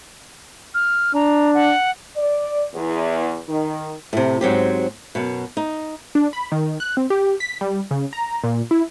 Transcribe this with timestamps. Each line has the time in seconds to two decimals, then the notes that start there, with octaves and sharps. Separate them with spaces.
0.74 F6
1.15 D4 A#5
1.54 F#5
2.16 D5
2.74 E2
3.49 D#3
4.13 A2 C3
4.41 G#2 F#3 C4 G4
5.15 F#2 B2
5.57 D#4
6.15 D4
6.33 B5
6.52 D#3
6.80 F#6
6.97 C4
7.10 G4
7.40 B6
7.61 G3
7.91 C#3
8.13 A#5
8.44 A#2
8.71 E4